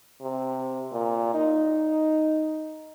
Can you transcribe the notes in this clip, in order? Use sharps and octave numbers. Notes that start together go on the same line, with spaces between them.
C3
A#2
D#4